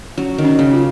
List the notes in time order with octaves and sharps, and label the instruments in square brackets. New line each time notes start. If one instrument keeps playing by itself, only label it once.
[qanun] F#3 [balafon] C#4
[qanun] D#3
[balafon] C#4
[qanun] C#3
[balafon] F4